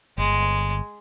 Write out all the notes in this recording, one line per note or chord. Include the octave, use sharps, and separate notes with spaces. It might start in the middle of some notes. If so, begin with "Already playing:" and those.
G1 G#3